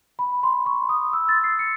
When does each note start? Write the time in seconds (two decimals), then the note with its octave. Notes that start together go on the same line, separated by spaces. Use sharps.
0.19 B5
0.43 C6
0.66 C#6
0.89 D#6
1.13 E6
1.29 A6
1.44 C7
1.59 C#7